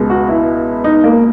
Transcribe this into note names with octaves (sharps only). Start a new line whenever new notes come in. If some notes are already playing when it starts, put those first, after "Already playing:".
Already playing: C#2 B2 G#3
F#4
E4
D#4
A#3